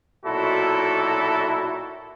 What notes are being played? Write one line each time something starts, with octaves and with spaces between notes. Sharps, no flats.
B1 A#2 E4 F#4 A4